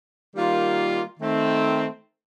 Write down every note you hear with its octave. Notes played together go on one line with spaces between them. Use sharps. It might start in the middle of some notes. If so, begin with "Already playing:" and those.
D#3 G3 A#3 F4
D#3 A3 C4